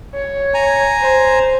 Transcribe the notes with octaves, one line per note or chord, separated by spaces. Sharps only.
C#5
G#5 A#5
C5